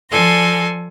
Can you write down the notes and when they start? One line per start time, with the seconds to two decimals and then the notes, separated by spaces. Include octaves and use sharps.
0.10 F3 A4 D5 G#5 C6 A#6